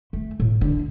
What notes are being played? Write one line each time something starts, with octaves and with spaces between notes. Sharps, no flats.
A3
A2
D3